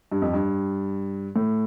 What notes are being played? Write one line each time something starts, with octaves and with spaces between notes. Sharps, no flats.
G2
F2
G2
A2